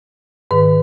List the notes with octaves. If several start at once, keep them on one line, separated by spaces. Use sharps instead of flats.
G#2 D#3 B4